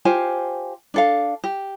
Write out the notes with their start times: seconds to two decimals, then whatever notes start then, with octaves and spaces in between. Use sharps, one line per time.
0.05 F4 G4 C5 G#5
0.94 D4 A4 F5
1.44 G4